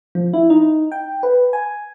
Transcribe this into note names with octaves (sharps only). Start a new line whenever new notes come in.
F3
E4
D#4
G5
B4
G#5